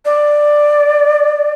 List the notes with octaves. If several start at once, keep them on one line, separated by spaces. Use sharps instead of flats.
D5